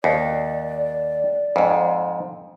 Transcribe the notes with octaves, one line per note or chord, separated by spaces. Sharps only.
D#2 D5
F2 G#2